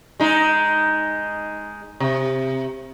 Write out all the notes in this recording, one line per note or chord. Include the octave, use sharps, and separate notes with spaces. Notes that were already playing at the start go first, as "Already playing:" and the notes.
G#3 D#4
C3